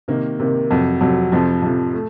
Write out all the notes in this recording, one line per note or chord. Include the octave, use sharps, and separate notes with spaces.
C3 D#3 A#3
C3 D#3 A#3
F2 C3 F#3
F2 C3 F#3
F2 C3 F3
F2 C3 F3
A3